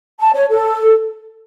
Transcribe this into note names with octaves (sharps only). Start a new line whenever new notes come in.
A5
C#5
A4